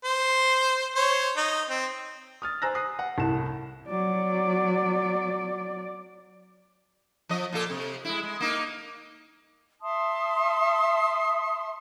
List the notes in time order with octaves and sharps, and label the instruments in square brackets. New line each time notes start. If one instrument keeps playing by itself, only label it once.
[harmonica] C5
C5 C#5
D#4
C4
[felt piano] D#6 F6 A6
C5 G#5 A#5 E6 F#6 A#6
D#6 F#6 C7
F#5
C2 A2 A5 E7
[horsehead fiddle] F#3 D5
[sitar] F3 D#5
A#2 F4 A4
C3
G#3 E4
G#3
A#3 D#4
[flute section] E5 A5 C6 D#6